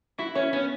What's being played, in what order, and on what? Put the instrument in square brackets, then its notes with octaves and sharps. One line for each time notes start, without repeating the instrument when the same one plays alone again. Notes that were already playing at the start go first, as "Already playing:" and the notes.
[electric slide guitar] E4 [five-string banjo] F#4
[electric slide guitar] C#4 [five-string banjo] C#5
[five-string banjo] B3 [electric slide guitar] C#4